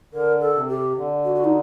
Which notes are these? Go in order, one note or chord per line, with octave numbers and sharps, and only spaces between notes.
D3 A#4
A4
C3
G4
D3
F#4
F#4
D#4